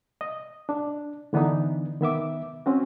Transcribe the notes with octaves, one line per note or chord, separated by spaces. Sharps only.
D#5
D4
D3 E3 B3 D4 D#4
D#3 B3 E5 D6
C4 C#4 F#4